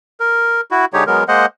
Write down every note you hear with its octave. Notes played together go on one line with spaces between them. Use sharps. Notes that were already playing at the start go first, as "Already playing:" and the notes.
A#4
E4 F#4
D3 G#3 D#4 G4 C#5
F#3 G#3 B3 A#4
G#3 A#3 C5 D#5 F#5